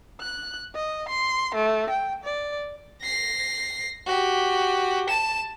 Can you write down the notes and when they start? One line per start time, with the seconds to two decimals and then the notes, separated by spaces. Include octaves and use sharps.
0.21 F#6
0.75 D#5
1.08 C6
1.55 A3
1.90 G5
2.23 D5
3.02 A#6 C7
4.07 F#4 G4
5.09 A5 E7